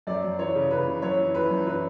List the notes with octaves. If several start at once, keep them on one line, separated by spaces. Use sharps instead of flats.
F#2 D5
F#2
E3 C#5
C#3
C#3 B4
E3
F#2 C#5
E3
E3 B4
F#2
E3 B4